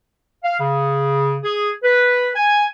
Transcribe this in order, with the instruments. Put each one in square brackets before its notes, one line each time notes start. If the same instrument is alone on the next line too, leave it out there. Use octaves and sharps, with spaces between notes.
[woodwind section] F5
C#3
G#4
B4
G#5